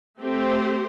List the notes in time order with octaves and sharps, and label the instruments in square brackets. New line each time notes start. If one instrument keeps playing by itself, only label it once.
[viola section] A3 C4 G4 C5